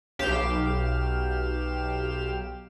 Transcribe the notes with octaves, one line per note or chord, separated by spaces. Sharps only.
B1 G4 F5 E7